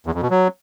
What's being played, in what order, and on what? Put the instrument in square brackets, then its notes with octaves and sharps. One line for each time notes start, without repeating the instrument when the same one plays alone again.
[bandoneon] E2
F2
B2
F#3